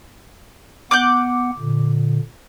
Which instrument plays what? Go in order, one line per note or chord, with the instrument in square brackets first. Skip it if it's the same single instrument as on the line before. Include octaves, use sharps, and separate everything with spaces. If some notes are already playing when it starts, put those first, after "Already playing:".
[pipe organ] B3 F#5 [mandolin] D6 F#6 G6
[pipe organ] A#2 D3